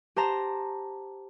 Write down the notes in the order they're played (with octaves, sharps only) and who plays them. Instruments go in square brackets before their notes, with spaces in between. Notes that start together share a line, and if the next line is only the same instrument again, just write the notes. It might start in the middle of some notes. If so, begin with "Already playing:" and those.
[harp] G4 C5 A5 A#5